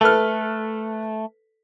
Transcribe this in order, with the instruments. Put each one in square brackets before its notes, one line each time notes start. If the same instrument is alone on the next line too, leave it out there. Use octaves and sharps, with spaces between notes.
[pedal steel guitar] A3 [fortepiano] A4 B4 F6